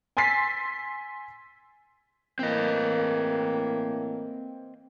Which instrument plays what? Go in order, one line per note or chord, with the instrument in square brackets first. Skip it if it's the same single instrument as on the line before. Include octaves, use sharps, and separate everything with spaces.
[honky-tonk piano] G#5 C6 E6 A6 B6 C7
[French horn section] A2 E3 A#3 [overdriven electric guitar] C4 D#5